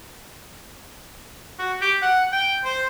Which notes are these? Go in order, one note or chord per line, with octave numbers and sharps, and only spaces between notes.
F#4
G4
F#5
G5
C5